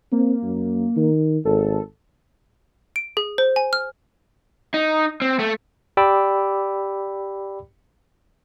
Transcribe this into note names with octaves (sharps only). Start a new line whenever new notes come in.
A#3 C4
F#2
D#3
G#1 A4
D7
G#4
C5
G#5
F6
D#4
C4
A3
G4 D5 G5 B5 D6 E6